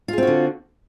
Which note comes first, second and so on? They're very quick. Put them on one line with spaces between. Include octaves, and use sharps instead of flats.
F4 G#4 C4 F#4 D3